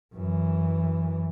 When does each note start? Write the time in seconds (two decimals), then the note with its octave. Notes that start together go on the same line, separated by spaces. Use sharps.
0.14 F#2 E3